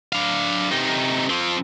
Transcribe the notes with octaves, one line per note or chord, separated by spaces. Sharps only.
D4 F5
C3 D#4
F3 C4